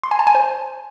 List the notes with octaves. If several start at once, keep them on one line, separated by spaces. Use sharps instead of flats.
C6
G#5
A5
G#5
C5